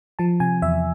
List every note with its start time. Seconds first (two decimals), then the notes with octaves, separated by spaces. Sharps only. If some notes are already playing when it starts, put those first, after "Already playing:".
0.19 F3 A5
0.40 C3 G#5
0.62 E2 E5